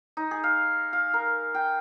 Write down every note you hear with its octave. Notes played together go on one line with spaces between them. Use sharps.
D#4
G#4
F5
F5
A#4
G5